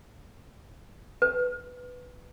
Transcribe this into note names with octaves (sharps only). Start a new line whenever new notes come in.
B4